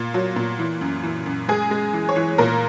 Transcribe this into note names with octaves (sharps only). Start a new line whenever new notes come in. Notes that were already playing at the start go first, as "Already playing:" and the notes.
Already playing: A#2
F#3
A#2
E3
F#2
E3
F#2
G#3 G#4
G#3
E3
C#5
E3
A#2 A#4